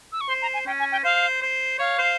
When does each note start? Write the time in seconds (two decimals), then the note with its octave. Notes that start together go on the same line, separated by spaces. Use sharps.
0.12 E6
0.21 C#6
0.29 C5 C6
0.42 A#5
0.54 G#5
0.67 C#4 G5
0.79 G#5
0.92 G5
1.04 C5 F5
1.42 C5
1.79 C#5 F5
1.99 C5